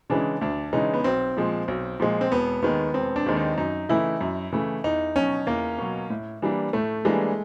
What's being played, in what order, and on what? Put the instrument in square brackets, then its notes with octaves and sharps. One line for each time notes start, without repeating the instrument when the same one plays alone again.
[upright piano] C#3 E3 G#3 C#4 [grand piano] D4
[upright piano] D2 [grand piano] D4
[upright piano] C#3 E3 G#3 C#4 [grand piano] D#4
[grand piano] B3
[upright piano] B1 [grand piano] C4
[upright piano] A#2 F3 G#3
B1
A#2 F3 G#3
[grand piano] C4
[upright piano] E1 [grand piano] B3
[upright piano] D#2 D#3 G#3 [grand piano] B3
[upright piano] E1 [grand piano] C4
[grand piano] D4
[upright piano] D#2 D#3 G#3
[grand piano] D#4
[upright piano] F#2 [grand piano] D#4
[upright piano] C#3 E3 A3 [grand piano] E4
[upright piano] F#2
C#3 E3 A3
[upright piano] E2 [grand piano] D#4
[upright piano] B2 F#3 [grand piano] C#4
[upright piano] E2 [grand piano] A#3
[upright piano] B2 F#3
A2
E3 G3 A#3 D4
[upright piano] A2 [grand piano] A3
[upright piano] E3 G3 A#3 D4 [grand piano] G#3